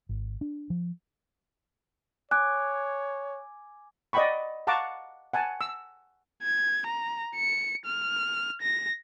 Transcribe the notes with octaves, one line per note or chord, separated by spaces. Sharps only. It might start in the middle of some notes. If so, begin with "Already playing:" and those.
G#1
D4
F3
C#5 G#5 D6 F#6 G#6
D5 D#5 F#5 G5 B5 C#6
F5 F#5 A5 A#5 C#6 D6
F#5 G#5 A5
E6
G#6
A#5
C#7
F6
A#6